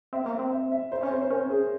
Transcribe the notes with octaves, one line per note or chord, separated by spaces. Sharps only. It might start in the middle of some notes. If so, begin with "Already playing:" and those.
C4 E5
A#3
C4
E5
E5
C5
E5
C#4 C#5
C4 C5
C5
C#4 A#4
C4
C#4 G#4